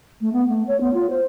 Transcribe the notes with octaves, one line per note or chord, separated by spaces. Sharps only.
A3
B3
A3
C#5
B3
F4
C5